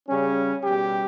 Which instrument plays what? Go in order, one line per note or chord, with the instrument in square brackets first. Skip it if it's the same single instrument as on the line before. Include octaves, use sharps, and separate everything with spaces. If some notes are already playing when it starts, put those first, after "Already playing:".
[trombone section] C#3 G3 C#4
B2 G3 G4